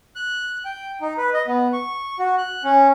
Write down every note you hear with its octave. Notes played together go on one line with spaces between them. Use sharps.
F#6
G5
D#4
B4
D#5
B3
C#6
F#4
F#6
C#4